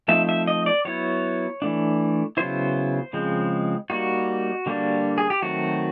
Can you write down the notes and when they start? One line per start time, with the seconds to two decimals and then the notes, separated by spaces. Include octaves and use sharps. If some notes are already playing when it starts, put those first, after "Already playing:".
0.08 F3 A3 C4 D#4 E5
0.29 E5
0.47 D#5
0.66 D5
0.85 F#3 B3 E4 C#5
1.62 E3 A3 D4
2.37 C#3 F#3 B3 E4 C5
3.13 C#3 F3 G#3 C4
3.90 G3 A#3 D#4 F#4
4.66 D3 G3 A#3 D4
5.18 G#4
5.30 G4
5.42 D#3 F#3 A3 C4 F#4